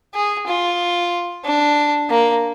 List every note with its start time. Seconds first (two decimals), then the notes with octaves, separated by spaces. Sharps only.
0.14 G#4
0.47 F4
1.45 D4
2.10 A#3